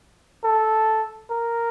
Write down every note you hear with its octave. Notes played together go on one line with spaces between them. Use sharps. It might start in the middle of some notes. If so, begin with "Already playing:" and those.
A4
A#4